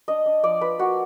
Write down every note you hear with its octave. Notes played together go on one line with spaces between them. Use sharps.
D4 D#5
D4
F3 D5
F3 B4
A#3 F#4